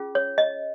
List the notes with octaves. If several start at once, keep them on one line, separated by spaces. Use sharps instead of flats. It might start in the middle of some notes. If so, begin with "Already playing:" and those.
Already playing: C#4 F4 G#4
C#5
D#5